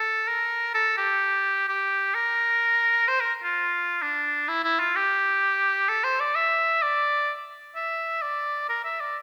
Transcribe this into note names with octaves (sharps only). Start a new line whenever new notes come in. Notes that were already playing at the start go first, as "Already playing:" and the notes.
Already playing: A4
A#4
A4
G4
G4
A#4
C5
A#4
F4
D4
E4
E4
F4
G4
A4
C5
D5
E5
D5
E5
D5
A#4
E5
D5